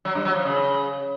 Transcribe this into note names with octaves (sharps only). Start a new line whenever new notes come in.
F#3
G2
F#3
F3
C#3